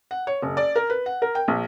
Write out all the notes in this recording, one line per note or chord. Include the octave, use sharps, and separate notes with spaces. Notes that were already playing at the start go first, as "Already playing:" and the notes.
F#5
C#5
F#1
D5
A#4
B4
F#5
A#4
G5
A#1